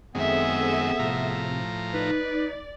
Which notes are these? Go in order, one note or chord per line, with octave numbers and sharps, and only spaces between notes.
F#2 D#3 G#3 B3 C4 G#4 A4 E5
A2 C3 F3 A#5
D#4 B4 D5